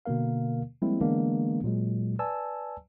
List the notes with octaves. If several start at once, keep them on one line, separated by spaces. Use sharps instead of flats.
B2 D3 A#3 A#4 F5
F3 G3 G#3 A#3 C4 E4
D3 E3 G#3 A#3 B3 D4
A#2 F#3 G#3
B4 D5 G#5 A5 E6